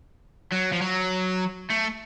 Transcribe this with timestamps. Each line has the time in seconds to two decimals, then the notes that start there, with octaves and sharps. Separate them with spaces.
0.52 F#3
0.73 F3
0.82 F#3
1.70 A3